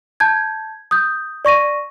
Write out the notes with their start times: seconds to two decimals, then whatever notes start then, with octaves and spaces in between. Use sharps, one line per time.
0.20 A5 G6 G#6
0.91 D#6 G6
1.45 D5 C#6 A#6 D#7